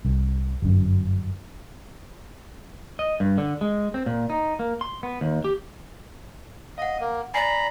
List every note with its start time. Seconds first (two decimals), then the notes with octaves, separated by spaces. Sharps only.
0.05 C2
0.62 G1 F#2
2.99 D#5
3.20 G2
3.38 D3
3.61 G#3
3.94 C4
4.06 A#2
4.30 D#4
4.59 A#3
4.81 C6
5.03 B3
5.21 D#2
5.44 G4
6.78 D#5 F5 F#5
7.00 A#3
7.34 D5 G#5 A#5 B5 C7